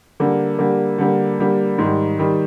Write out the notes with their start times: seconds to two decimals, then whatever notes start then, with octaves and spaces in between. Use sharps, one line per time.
0.20 D3 G3 A#3
0.59 D3 G3 A#3
0.98 D3 G3 A#3
1.39 D3 G3 A#3
1.78 G#2 D#3 G3
2.19 D#3 G3